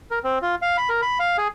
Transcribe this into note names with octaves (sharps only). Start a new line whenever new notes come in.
A#4
C4
F4
F5
B5
A#4
B5
F5
G#4